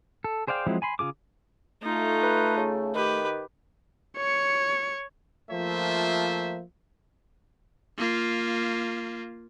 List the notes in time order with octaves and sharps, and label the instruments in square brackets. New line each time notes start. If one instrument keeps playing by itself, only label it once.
[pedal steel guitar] A4
G#4 C5 D5 F5 G5
F3 F#3 G#3 C4 E4
G#5 B5 C6
C#3 F4 G#4 D6
[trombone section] A3 [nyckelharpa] D#4 F4
[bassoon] B4
C#3
[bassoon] D#3 [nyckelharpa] G4 B4
[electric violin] C#5 C#7
[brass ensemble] F3 A3 A#3 F4 C5 E5
[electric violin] A#3 F4